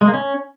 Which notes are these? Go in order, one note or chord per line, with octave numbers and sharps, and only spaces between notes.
G#3
A#3
C#4